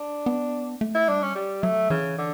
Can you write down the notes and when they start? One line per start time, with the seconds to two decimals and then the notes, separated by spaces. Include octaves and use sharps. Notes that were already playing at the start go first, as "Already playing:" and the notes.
Already playing: D4
0.26 B3
0.81 A3
0.95 E4
1.08 G3 D4
1.23 C#4
1.35 G3
1.63 F#3 A3
1.90 C#3 E3
2.18 D3